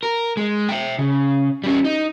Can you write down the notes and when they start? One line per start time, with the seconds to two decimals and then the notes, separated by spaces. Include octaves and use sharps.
0.03 A#4
0.37 G#3
0.69 E5 G5
0.99 C#3
1.64 G3 C#4
1.84 D#4